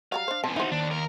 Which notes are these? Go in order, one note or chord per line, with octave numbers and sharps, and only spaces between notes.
F#3 G3 F5 A#5
D4 C5
B2 E3 C4 A5
D#4 E4 F#4 C5
D#2 D4
A#4